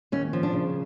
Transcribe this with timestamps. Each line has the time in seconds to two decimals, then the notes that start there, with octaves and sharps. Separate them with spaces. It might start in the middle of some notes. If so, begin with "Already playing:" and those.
0.12 D#2 C#4
0.33 F3
0.43 D4
0.53 C#3